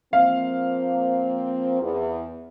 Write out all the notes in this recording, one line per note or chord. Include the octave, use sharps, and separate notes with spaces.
F3 A#3 C4 F5
E2